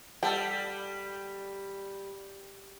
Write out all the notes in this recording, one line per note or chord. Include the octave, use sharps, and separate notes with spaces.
G3 A4 F#5 G5